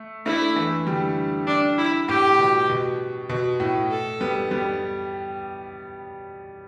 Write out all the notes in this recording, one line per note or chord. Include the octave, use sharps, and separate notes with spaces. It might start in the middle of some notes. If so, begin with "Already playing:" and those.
Already playing: A3
A3 D4 E4
E3 A3
D3 G3
D4
E4
A2 G4
B2
B2
B2
A2
A4
G3 B3
G3 B3